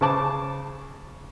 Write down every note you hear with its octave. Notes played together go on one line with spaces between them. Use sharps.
C#3 C5 A5 D6